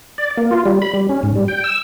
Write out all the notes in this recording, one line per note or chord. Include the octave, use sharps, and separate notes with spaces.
D5
A#3
F4
G3
B5
G3
C#4
G#2
G3
G5
E6